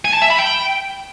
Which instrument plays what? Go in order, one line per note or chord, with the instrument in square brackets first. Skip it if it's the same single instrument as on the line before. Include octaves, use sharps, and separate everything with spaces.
[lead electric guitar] G#5
A5
E5
B5
G5